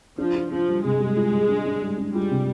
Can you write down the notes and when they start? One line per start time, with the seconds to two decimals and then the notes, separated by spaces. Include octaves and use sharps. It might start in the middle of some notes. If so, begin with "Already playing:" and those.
0.18 F3 D4
0.35 F4
0.51 F3 D4
0.68 G3
0.84 C3 G#3
1.00 G3
1.17 F4
1.33 G3
1.49 D4
1.65 D4
1.82 G3
1.98 D4
2.14 G3 F4
2.31 C3